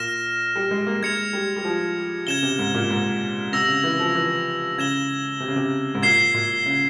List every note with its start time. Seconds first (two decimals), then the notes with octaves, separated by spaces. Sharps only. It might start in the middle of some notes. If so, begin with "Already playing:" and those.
Already playing: A#2 F6 A#6 E7
0.56 G3
0.71 G#3
0.87 A#3
1.02 G#3 G#6 C#7 F7
1.33 G3
1.56 G3
1.64 F3
2.27 C#3 G#6 E7 G7
2.43 C3
2.59 G#2
2.74 A#2
2.90 G#2
3.53 C3 E6 A#6 F7
3.68 C#3
3.84 E3
3.99 F3
4.15 E3
4.78 C#3 G#6 E7 G7
5.40 C3
5.48 C#3
5.56 C3
5.95 G#2
6.02 A#2 G#6 C7 E7 G7
6.34 A#2
6.66 C#3